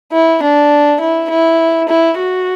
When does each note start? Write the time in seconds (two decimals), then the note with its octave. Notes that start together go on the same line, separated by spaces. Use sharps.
0.13 E4
0.42 D4
1.00 E4
1.30 E4
1.88 E4
2.17 F#4